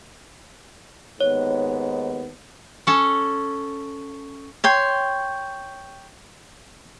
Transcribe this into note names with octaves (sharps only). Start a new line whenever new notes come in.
D#2 G#2 B3 C#5
C#4 A4
C#5 G5 C6